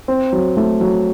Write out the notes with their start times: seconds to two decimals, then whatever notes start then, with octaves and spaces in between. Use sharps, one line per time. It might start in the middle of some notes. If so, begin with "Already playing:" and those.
0.08 C4
0.33 F#3
0.57 A3
0.81 F#3